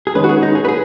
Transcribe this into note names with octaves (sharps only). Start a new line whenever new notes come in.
G#4
D#3 G#3 C#4 B4
F#4
G#4
D#4
G#4
B4
G#4